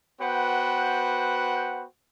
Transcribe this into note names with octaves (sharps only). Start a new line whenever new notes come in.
B3 F#4 B4 C5 F#5 G5